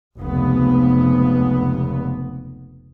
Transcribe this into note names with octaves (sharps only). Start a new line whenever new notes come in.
F1 C#2 B3